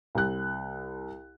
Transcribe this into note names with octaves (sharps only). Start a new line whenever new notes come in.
C2 F#6